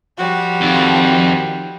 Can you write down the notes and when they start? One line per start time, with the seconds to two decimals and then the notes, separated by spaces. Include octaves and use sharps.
0.18 F3 G3 F#4
0.61 F2 D#3